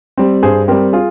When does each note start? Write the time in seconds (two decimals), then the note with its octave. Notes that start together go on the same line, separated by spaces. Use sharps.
0.17 G3 C4
0.43 G2 G#4 C5
0.68 G3 C4 G4 A#4
0.93 F4 G#4